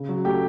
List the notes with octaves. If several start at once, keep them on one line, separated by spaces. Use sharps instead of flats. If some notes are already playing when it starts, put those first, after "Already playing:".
Already playing: C#3
F#3
A3 G4 G5